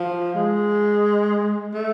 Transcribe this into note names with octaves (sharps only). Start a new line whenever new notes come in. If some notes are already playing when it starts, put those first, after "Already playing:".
Already playing: F3
G#3
A3